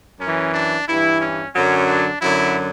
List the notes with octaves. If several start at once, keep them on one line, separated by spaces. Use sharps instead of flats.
F#2 E3 C#4
D4
G2 E3 E4
C#4
F#2 D3 F#3 C#4
D4
F#2 D3 F#3 E4